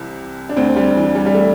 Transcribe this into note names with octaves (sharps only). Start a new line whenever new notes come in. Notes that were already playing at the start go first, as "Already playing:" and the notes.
Already playing: C2 C3 E3
D4
D2 D3 C4
G3
E3
G3
G3
A3